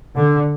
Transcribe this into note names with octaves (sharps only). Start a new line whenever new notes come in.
D3